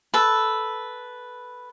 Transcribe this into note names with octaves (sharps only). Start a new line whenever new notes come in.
A4 B4